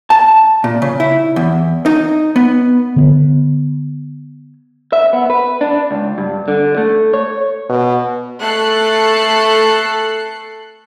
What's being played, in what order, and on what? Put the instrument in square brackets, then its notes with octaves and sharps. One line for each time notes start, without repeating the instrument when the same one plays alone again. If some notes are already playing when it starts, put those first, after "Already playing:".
[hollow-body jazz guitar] A5
A#2
C#3
E4
E2
D#4
B3
[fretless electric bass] D3 B3
[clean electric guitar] E5
B3
B4
D4
C#2
G2
D3
A3
C#5
[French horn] B2
[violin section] A3 A4 F#6 C7 C#7